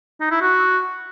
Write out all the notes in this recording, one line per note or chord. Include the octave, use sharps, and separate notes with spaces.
D#4
E4
F#4